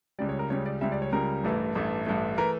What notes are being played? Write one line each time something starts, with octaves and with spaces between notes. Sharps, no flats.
C#2 C#3 G3 D5
C#5
A#4
C#2 C#3 G3 C#5
D5
C#2 C#3 G3 E5
D5
C#5
C#2 C#3 G3 A#4
A1 G2 E3 A3
A1 G2 E3 A3
A1 G2 E3 A3
E3 A3 A#4